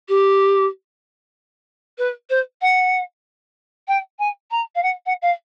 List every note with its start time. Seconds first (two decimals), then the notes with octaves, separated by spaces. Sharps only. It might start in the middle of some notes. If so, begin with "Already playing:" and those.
0.08 G4
1.98 B4
2.30 C5
2.61 F#5
3.88 G5
4.19 G#5
4.51 A#5
4.75 F5
4.83 F#5
5.06 F#5
5.22 F5